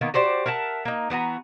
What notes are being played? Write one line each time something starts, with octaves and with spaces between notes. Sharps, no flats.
D#3 A#3 B3 D#4
F#4 G4 C5 D5
A#4 E5 F#5 A5
A#3 D#4
E3 B3 F#4 A#5